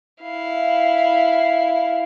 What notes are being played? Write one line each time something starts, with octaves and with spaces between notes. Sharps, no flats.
E4 F5